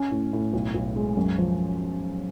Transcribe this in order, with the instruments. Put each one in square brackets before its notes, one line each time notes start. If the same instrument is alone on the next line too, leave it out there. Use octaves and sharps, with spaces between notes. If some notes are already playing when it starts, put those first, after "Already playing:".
Already playing: [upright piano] C#4
A2
A2
B1
B1
G#3
F#2
F3